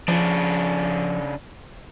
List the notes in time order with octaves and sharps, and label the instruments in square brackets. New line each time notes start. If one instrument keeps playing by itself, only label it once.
[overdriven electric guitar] C#3 D4 [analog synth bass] F3